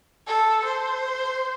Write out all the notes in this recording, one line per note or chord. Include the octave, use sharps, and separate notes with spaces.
A4
C5